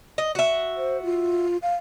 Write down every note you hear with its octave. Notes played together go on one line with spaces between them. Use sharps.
D#5
F#4 E5
C5
F4
F5